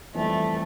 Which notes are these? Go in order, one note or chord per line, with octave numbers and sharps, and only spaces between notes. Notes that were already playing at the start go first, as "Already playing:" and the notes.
F2 E3 G3 A3 C4 E4